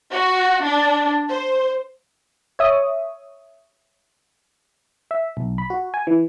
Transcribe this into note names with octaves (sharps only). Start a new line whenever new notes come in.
F#4
D4
C5
C#5 E5 D#6
E5
B1
B5
F#4
G#5
E3